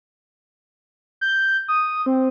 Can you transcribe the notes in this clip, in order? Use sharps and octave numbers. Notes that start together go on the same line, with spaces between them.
G6
D#6
C4